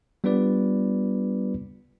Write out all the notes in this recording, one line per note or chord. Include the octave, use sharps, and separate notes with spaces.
G3 B3 D4 F4 B4 D5